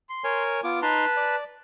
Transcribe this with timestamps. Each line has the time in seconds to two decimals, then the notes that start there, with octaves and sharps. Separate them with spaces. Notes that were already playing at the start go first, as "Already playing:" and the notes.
0.09 C6
0.24 A#4 C#5 G#5
0.64 B3 F4 D6
0.82 D#4 B4 A5 A#5 C6
1.17 D5